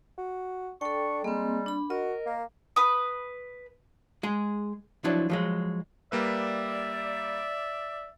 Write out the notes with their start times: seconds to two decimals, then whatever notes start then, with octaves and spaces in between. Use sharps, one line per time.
0.18 F#4
0.81 D4 A4 G5 C#6
1.24 G3 G#3 A#3 C4
1.66 D4 B5
1.90 F#4 A#4 D#5
2.26 A#3
2.76 B4 D#6
4.23 G#3 G#4
5.04 F3 F#3 D4 E4
5.30 F3 F#3 G#3
6.12 G3 A#3 B4 D5 E5